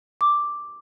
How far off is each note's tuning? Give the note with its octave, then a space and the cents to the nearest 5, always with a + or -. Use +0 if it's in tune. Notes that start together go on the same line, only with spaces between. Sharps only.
D6 +0